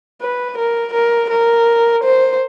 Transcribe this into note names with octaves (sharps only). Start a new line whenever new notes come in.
B4
A#4
A#4
A#4
C5